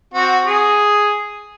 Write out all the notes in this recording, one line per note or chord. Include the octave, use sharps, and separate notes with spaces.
C4 F#4
G#4